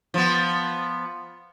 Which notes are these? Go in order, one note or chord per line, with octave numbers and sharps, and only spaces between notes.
F3 B3